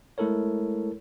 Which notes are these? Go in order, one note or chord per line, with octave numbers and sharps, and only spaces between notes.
G#3 A3 E4 A4 A#4 C#5